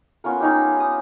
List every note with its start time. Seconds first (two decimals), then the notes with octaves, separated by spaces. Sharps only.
0.24 B3 C#4 F4 A#4
0.40 C#4 D#4 G4
0.80 D#6